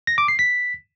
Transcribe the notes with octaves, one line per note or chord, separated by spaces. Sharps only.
A#6
D6
C7
B6